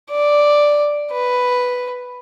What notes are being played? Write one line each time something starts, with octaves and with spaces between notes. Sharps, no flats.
D5
B4